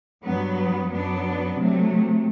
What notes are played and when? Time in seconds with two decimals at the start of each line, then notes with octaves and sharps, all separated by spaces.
0.24 G2 F#3 B3
0.89 F#2 F#3 B3 D4
1.56 C3 F#3 A3